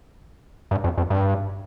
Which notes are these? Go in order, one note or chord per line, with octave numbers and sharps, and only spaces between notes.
G2
F2
F2
G2